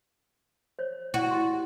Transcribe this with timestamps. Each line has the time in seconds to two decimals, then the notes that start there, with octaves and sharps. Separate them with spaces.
0.79 C5 C#5
1.14 E4 F#4 D5
1.31 E4 G4 C6